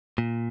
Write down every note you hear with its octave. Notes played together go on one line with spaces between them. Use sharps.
A#2